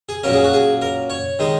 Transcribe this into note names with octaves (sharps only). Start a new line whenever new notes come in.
G#4
A#2 F#3 A#3 C#4 A#4
G#4
F#4
G#4
A#4
C#5
D#3 G#3 D#4